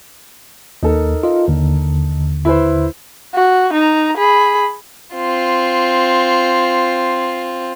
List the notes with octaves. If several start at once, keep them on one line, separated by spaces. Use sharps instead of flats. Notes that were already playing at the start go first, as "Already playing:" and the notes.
D#2 D#4 A4 A#4
F4 D#5
D#2 D3
E4 B4 C5
F#4
D#4 A#5
G#4 B5
C4 F4